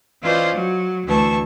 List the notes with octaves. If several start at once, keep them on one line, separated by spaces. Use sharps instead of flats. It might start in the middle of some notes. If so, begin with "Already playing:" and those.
E3 C#4 F4 C5 D5 D#5
F#3
D2 E3 A5 C#6